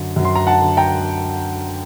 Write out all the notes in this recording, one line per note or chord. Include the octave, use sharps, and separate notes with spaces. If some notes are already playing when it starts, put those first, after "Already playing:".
Already playing: F#2 D3
F#2
C6
A#5
F#5 A5
D3
G5 A#5